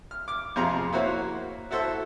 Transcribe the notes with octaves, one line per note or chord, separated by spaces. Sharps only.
F6
D6 F6
F2 C3 F4 G#4 A#5
A#3 E4 F#4 C5 C#5
E4 F#4 A4 C5 E5